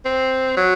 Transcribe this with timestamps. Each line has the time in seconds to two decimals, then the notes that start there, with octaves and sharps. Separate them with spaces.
0.05 C4
0.57 F#3